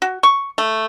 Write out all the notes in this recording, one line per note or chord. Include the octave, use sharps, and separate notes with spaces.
F#4
C#6
A3